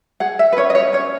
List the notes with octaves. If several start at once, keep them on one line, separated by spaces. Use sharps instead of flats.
G#4 F#5
E5
B4
C#4 C#5
D#5
C#5
C#4 C#5